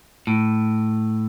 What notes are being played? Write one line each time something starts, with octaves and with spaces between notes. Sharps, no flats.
A2